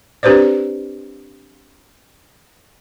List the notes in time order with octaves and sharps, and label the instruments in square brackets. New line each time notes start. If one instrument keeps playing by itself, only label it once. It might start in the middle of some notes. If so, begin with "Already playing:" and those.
[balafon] C4 D4 G4 B4 C5 D5